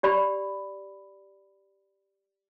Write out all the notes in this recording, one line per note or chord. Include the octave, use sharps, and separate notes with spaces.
G4 D5 B5